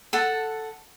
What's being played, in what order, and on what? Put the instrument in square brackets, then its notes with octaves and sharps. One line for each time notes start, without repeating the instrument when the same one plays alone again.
[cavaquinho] A4 F#5 A5